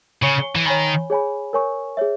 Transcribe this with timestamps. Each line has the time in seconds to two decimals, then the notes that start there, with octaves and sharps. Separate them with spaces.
0.23 C#3 C#5 G#5 C#6
0.56 E3
0.66 D#3 C#5 G#5 B5
1.10 G#4 C#5 G#5 B5
1.53 A#4 C#5 G#5 C#6
1.97 G#4 C#5 E5